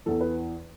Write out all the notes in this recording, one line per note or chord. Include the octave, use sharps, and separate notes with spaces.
E2 E3 A4
B4